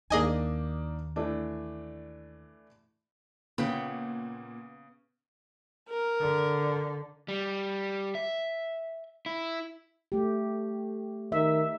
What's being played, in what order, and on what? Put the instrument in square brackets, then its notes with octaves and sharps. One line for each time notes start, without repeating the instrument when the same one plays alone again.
[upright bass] D#2 [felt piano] A#3 D4 D#4 [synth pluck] G#4 D#5 G#5
[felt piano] E3 A3 D4
[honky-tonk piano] A#2 [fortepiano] C#3 [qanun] B3 B4 G5
[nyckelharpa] A#4
[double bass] D3
[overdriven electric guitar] G3
E5
E4
[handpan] A3 G4
[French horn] D#3 [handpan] E5